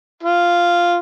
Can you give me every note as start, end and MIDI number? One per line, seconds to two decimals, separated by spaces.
0.23 0.97 65